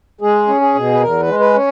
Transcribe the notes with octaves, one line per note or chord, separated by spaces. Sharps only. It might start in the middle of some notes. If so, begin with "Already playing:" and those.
G#3 G#4
C#4
G#4
B2
B4
E2 A#4
B4
G#3
B4
C#4